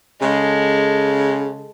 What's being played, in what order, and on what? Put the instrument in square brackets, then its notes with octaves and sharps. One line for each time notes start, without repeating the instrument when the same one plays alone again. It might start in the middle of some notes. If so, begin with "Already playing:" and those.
[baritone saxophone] C#3 [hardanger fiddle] G#3 A4